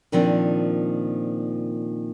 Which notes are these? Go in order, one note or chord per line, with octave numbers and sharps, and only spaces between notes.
A#2 D#3 F3 C4 D4